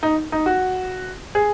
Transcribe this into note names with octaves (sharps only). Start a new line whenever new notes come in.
D#4
D#4
F#4
G#4